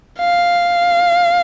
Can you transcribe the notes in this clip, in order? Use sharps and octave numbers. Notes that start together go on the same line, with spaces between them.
F5